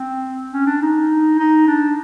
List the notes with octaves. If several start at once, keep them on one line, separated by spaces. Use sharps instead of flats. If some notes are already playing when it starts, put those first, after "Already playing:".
Already playing: C4
C#4
D4
D#4
D#4
D4